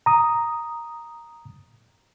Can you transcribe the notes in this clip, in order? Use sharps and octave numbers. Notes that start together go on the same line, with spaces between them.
A#5 D#6